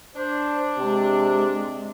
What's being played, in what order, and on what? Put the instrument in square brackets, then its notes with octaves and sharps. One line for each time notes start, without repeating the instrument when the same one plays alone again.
[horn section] D4 [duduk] C5
[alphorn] C3 [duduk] G#3